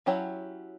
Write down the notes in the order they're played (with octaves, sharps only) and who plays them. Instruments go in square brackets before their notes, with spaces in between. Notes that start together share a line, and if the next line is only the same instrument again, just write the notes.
[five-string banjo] F#3 C#4 E4 G4 C#5